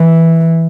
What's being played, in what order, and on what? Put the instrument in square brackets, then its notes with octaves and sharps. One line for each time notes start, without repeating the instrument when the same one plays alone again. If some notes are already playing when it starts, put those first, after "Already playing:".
Already playing: [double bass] E3